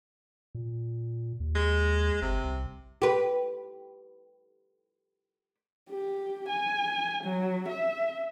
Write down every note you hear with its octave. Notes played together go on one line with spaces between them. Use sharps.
A#2
D#2
G#3
G1 C3
C2
G4 B4
G4
G#5
F#3
E5